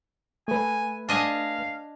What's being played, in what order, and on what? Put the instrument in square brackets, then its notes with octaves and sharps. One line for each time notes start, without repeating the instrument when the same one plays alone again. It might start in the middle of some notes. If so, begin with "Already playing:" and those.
[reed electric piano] A3 B4 [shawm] G#5
[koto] D4 D#5 G#5 [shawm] F5